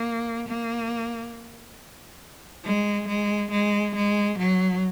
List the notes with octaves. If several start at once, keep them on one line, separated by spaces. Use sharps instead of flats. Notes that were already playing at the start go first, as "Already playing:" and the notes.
Already playing: A#3
A#3
G#3
G#3
G#3
G#3
F#3